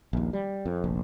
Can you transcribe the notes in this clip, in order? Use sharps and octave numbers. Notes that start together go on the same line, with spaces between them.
A#1 D#2
G3
F2
F1 A#1